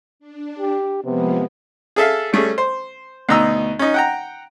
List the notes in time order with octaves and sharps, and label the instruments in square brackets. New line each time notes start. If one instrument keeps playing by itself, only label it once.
[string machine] D4
[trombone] G4
[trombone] C3 [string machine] F3 G#3 A#3 [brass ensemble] B3
[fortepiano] G#4 A4 E5 F5
G3 A3 C#4 G#4
C5
D2 B2 D#4 A#5 E6
C#4 D#4
F#5 G5 A#5